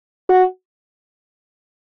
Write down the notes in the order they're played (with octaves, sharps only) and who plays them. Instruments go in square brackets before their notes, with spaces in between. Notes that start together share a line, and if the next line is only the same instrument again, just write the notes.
[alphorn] F#4